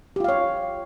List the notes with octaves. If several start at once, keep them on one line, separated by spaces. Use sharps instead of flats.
F4 G4 C#5 F5